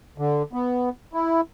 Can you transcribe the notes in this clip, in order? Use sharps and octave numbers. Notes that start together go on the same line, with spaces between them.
D3
B3
E4